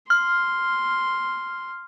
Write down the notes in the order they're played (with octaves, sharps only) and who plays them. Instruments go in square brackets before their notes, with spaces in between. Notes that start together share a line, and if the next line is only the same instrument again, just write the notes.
[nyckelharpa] C6 [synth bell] F6